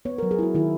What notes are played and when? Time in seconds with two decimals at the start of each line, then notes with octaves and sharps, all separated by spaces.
0.05 B3 C#5
0.18 A#4
0.23 F#3
0.31 G#4
0.39 E4 F#4
0.55 D#3 E4